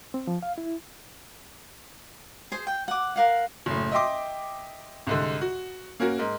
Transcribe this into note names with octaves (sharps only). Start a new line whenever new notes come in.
C4
F3
F5
E4
G#4 C5
G5
F#5 D6
A#4 F5 F#5
F#1 A2
D#5 E5 G5 C6 D6
C2 G#2 D3
F#4
A#3 C#4 F#4 A#4
G#2 A#4